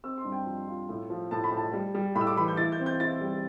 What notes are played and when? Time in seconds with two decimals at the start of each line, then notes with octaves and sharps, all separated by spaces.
0.04 C4 E6
0.18 C6
0.25 G2
0.32 G5
0.46 F3
0.67 F4
0.89 A2
1.10 F3
1.31 A2 A5
1.44 B5
1.51 A2
1.57 A5
1.73 G3
1.95 G3
2.15 A2 B5
2.21 E6
2.27 D6
2.37 E3 B5
2.48 G6
2.57 E4 A6
2.72 G6
2.80 C4
2.86 G6
3.00 E4 A6
3.21 G3